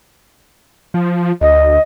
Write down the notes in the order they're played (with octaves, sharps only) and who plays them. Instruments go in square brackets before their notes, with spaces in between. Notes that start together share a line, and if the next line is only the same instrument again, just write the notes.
[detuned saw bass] F3
[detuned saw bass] D2 [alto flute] D#5